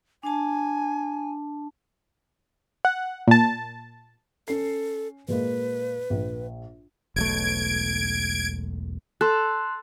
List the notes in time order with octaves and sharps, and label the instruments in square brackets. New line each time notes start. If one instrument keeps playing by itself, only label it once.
[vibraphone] D4 A5 [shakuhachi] G#5
[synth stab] F#5
A#2 A5
[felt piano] C#4 C7 [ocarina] A4
[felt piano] A#2 G#3 A#3 [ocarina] B4
[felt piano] A#1
[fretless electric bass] E1 B1 A3 [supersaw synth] G#6 D7
[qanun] A4 [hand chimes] C6 F#6